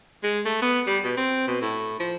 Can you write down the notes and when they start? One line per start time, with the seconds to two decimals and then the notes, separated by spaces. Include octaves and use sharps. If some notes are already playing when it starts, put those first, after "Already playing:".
0.23 G#3
0.45 A3
0.62 B3
0.87 G3
1.04 B2
1.17 C4
1.47 B2
1.61 A2
1.99 F3